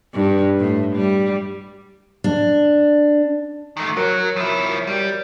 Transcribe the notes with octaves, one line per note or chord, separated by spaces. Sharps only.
G2
A2
G3
D4
D#3 A3
F#3 F#4 A#4 C#5
F3 E4
G3